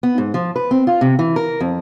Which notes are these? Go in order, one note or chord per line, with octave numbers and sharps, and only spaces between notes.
B3
G#2
F3
B4
C4
F4
C3
E3
A#4
F2